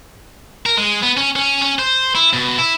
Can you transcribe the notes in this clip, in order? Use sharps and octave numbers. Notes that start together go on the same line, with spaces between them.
A#4
G#3
B3
C#4
C#4
C#4
C5
E4
B2
E4